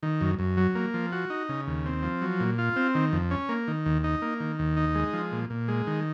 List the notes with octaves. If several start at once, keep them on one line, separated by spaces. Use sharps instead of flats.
D#3
F#2
F#2
F#3
A#3
F3
F#4
D#4
C#3
D#2
C4
F3
F#3
A#2
F4
C4
D#3
F2
C#4
A#3
D#3
D#2
D#4
A#3
D#3
D#2
D#4
G#3
F3
A#2
A#2
G#3
D#3